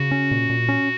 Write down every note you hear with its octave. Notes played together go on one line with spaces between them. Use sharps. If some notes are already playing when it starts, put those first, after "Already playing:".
Already playing: C#3 F#4
C#4
A#2
A#2
C#4